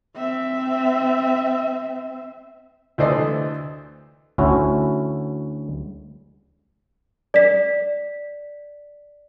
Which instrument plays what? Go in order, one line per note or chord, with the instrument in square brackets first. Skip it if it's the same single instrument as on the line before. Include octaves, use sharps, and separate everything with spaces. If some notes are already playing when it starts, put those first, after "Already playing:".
[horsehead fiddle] C4 E5
[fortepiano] D2 E3 A4 C5 D5 D#5
[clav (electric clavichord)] D2 C#4 E4 F#4
[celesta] D5 B6